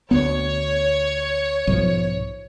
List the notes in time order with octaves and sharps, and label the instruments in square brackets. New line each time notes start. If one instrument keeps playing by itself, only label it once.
[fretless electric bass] D2 B3 [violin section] C#5
[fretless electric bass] B1 G#2 F3